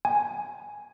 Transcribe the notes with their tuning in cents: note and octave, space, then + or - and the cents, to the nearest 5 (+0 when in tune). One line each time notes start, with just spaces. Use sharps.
G#5 +0